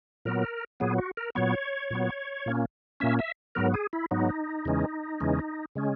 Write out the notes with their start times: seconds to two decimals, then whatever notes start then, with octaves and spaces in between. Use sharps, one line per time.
0.25 A#2 F#3 B3 A#4
0.80 A#2 F#3 B3 G#4
0.98 F#4
1.17 A#4
1.35 A#2 F#3 B3 C#5
1.91 A#2 F#3 B3
2.46 A#2 A#3 C#4
3.00 A#2 A#3 C#4 E5
3.19 E5
3.55 G#2 F#3 B3 A#4
3.74 G#4
3.93 E4
4.11 G#2 F#3 B3 D#4
4.65 E2 C#3 E3 G#3 C#4
5.20 E2 C#3 E3 G#3 C#4
5.75 C#3 G#3 C#4